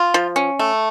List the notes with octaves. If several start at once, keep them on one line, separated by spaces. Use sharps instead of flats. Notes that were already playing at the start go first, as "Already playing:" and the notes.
Already playing: F4
F3
C#4
A3